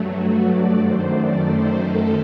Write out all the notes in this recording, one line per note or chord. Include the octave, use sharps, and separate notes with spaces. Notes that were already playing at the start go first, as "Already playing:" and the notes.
Already playing: G2 F#3 A3
F#4
D5
F#2 D#3 A3 C5
D5
C5
A4